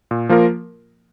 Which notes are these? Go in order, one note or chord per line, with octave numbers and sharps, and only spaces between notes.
A#2
F3 A#3 F4 A#4